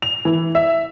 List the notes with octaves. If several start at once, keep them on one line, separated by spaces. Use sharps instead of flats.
F7
E3
E5